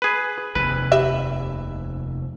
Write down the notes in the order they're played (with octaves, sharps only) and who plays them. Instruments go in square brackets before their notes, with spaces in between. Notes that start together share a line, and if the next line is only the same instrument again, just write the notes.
[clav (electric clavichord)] G#4 B4
[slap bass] F1 D#2 C3 [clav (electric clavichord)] B4
[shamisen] G4 D#5 E5